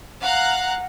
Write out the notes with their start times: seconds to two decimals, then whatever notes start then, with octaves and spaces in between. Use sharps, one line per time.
0.22 F5 F#5 A#5 F#6